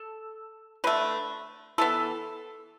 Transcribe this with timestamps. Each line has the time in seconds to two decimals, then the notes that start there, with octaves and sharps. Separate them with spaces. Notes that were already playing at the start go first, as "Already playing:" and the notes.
Already playing: A4
0.84 D3 A3 B4
1.78 E3 B3 A4